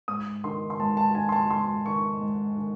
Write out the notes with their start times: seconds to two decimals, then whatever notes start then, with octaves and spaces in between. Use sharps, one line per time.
0.08 G#2 D#6
0.44 D#3 C6
0.70 C6
0.80 G#2 A5
0.97 A5
1.10 A5
1.15 D#3 G#5
1.29 C6
1.32 A5
1.50 G#2 C6
1.86 D#3 C#6
2.21 G#2
2.57 D#3